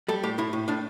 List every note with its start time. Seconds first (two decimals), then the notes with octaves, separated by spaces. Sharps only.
0.08 G3 A4
0.23 A2 G4
0.38 A2 E4
0.53 A2
0.68 A2 D4